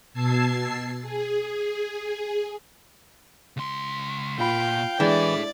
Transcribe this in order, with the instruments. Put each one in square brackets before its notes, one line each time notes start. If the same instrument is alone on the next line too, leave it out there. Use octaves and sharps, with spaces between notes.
[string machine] B2 A5 E6 G#6 C7
G#4
[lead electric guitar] C#2 C6
[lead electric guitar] A#2 [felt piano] F4 B5 [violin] F5 G5
[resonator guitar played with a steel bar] E3 [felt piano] G#3 D4 [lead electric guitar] E4 A4 [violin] D5